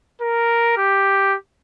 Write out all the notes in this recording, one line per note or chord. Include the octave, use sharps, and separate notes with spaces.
A#4
G4